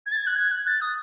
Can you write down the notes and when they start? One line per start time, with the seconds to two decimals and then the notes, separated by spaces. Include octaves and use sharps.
0.06 G#6
0.12 A6
0.16 G#6
0.27 F#6
0.36 G#6
0.51 F#6
0.67 A6
0.81 D#6